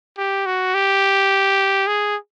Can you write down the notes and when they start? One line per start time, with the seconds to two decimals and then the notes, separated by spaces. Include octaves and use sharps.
0.18 G4
0.46 F#4
0.74 G4
1.87 G#4